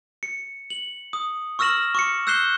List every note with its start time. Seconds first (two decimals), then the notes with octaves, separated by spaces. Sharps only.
0.23 C#7
0.70 F#7
1.13 D#6
1.59 C#6 E6 F6 A#6 E7 F#7
1.95 C#6 D6 C#7
2.27 E6 F#6 G6 C7 E7 G7